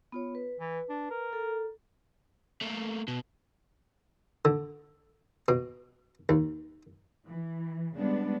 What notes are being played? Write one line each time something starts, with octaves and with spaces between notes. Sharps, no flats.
B3 F4 C#5
B4
E3
D4
A#4
A4
A3 A#3
B2
D3
B2
D#2
E3
C#3 G3 G#3 B3 D4